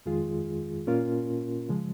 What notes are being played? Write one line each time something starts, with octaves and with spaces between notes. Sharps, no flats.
F2 D#3 G#3 F4 G#4
A#2 A#3 C#4 F4 A#4
C#3 F3 G#3